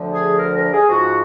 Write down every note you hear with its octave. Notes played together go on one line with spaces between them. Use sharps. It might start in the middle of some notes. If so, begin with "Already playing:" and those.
Already playing: D2 D3 F3
G#4
A#4
A#4
G#4
G#2 F3 F#4